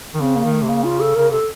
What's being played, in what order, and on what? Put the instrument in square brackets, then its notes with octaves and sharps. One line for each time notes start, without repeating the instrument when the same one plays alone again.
[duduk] D#3
[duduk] C#3 [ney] C4
[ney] A#3
[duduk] D#3
[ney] A3
[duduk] C3
[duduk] C#3 [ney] A#3
[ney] F4
A4
[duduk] C#3 [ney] A#4
[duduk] C3 [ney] A4